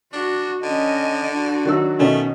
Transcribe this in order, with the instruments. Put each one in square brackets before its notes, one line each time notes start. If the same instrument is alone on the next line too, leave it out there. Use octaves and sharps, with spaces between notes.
[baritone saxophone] D4 [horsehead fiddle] F#4
[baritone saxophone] D3 [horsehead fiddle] C#4 D#5
[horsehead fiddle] D4 F#4
[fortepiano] D#3 F#3 E6
[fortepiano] B2 D#3 C#4 [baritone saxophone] A3